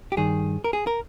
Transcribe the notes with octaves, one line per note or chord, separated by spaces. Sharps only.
G4
G2 D#3 G#4
A#4
G#4
A#4